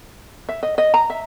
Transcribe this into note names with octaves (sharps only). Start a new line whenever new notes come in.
E5
D#5
D#5
A#5
E5